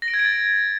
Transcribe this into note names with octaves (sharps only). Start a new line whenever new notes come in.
A#6
D7
G#6
D7
A6